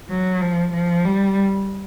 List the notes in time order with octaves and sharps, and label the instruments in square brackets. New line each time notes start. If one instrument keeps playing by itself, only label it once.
[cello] F#3
F3
F3
G3